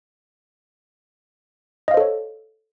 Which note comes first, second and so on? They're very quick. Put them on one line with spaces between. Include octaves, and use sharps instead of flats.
D#5 F5 C5 A4 C#5